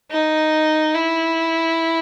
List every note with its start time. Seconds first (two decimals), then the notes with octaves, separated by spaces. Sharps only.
0.11 D#4
0.95 E4